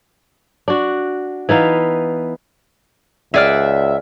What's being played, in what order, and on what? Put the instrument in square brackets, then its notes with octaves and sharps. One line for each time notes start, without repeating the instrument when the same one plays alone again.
[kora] D4 F#4
E3 B3 D#4 F5
[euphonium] C#2 [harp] G#4 D5 F6 [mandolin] E5 F#5